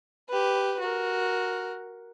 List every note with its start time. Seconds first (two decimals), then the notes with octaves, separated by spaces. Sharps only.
0.29 G4 B4
0.80 F#4 A#4